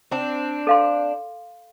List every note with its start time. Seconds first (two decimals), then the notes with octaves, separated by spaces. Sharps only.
0.11 C4 D4
0.67 A4 F5 C6